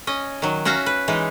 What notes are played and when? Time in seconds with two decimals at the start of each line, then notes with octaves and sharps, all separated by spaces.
0.07 C#4 D#5
0.42 D#3 F#3
0.65 C#4 F#4 E5 F5 A#5
0.86 B4
1.08 E3 G#3 D#4